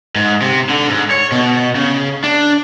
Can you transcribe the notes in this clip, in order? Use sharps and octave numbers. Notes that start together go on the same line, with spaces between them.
G#2
C3
D3
G#2
C#5
B2
C#3
D4